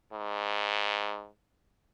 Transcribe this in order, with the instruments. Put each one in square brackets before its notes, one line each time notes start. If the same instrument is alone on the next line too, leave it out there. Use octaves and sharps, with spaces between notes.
[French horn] G#2